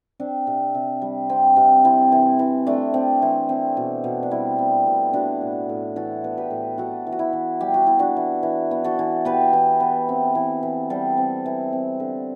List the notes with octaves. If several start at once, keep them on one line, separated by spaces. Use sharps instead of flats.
C4 D4
C3
C3
G3
C4
C3
C4 E4
E3
E3
A3 D4
C4
E3
C4
B2
B2
D4
G3 E4
C4
B2
B3 D4 F#4
A2
A2
E3 F#4 A4
B3
G4 B4
A2
B3 F#4 A4
E3
F#4
E4
E3
G3 G4
F#4
B3 E4
D4 F#4
E3
E3
B3
F#4 A4
E3
B3 G4 B4
E3
B3
C4
E3
E3
G3 A4 C5
C4
E3
C4
D3